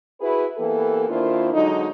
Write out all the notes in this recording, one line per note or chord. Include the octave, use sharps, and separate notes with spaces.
E4 F#4 G#4 B4
E3 A#3 B3 G4 A4
D#3 A#3 D4 E4 F4 C5
D3 F#3 G#3 D#4